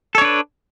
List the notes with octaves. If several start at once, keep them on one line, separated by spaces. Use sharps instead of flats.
D4 A4 B4 C#5